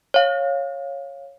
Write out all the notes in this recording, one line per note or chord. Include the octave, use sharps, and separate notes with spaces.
C#5 F5